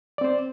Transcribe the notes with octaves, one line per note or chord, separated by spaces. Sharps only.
C4 C5 D5